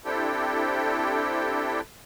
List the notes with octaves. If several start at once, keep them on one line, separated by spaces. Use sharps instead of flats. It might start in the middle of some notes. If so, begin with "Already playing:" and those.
C4 D4 E4 G4 A4 G5